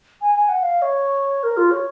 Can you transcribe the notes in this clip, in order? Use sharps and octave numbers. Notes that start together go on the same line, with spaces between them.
G#5
G#5
F#5
F5
C#5
A#4
F4
C#5